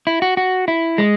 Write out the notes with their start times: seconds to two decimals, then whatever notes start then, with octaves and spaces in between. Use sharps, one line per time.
0.07 E4
0.22 F#4
0.37 F#4
0.68 E4
0.98 G#3